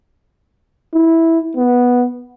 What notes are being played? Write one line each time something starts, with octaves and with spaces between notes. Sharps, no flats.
E4
B3